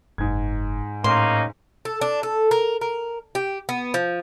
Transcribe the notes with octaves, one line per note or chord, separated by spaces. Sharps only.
F#1 G#2 G#6
A2 A#3 C#4 D#4 C6
A4
D4
A4
A#4
A#4
G4
B3
F3